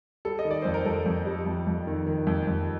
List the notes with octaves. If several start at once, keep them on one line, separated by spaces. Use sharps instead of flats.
G3 A4
D#5
D#3
D5
F2 C5
A#4
F2 A4
F2
G3
F2
F2
D#3
D#3
F2
F2